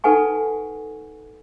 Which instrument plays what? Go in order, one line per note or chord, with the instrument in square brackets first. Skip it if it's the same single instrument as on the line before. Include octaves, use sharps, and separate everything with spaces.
[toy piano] D#4 A4 B4 F#5 G#5 C#6